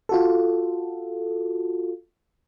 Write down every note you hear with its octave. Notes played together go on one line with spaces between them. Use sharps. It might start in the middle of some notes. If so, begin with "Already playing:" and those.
F4 F#4 A4